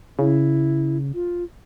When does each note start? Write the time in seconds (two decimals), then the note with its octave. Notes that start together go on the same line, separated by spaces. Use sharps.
0.19 C#3 E4
1.14 F4